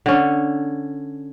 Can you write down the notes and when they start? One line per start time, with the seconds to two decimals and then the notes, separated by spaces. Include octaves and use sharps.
0.06 D3 C#4